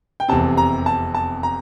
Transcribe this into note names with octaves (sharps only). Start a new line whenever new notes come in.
G5
F1 E2 C3 A5
A#5
A5
A5
A#5